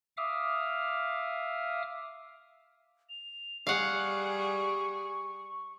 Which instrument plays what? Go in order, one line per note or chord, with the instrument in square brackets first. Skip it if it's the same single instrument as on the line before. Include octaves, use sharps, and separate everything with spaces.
[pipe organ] E5 F5 D6 D#6 F6
[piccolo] F7
[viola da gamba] G3 G#4 [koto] F5 F#5 [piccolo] C#6